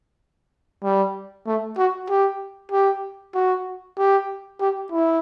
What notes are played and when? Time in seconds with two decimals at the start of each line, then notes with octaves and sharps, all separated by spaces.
0.84 G3
1.47 A3
1.77 F#4
2.10 G4
2.72 G4
3.35 F#4
3.98 G4
4.60 G4
4.92 E4